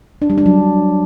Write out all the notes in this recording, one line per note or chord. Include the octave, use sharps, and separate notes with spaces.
D4
G3
D4
F#3